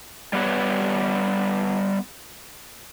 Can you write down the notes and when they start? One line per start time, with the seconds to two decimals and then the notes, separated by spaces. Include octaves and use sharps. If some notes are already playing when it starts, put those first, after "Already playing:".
0.33 G3 B3 G4 B4 C#5